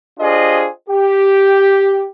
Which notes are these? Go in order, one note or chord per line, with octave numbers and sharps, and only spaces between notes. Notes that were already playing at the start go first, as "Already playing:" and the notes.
D4 F4 G4 G#4 C5 D#5
G4